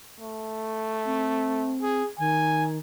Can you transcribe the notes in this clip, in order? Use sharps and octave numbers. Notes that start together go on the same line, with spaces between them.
A3
C4
G#4
D#3 G#5